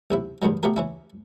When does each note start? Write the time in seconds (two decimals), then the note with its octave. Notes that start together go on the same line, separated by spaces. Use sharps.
0.11 B1 C3 E4
0.42 E2 G2 B2 D#3 F#3
0.63 B2 A3 B3 G4 A#4
0.76 E3 C#4 E4